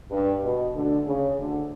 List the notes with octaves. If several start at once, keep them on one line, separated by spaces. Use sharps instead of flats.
G2
B2
D2 D3
C#3
D2 D3